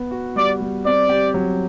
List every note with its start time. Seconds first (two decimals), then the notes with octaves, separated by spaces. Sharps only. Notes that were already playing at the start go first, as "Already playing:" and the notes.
Already playing: B3
0.11 F#4
0.36 G3 D5
0.60 G3
0.85 C4 D5
1.09 G4
1.34 F#3